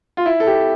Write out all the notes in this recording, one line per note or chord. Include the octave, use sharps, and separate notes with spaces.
F4
E4
A4
G4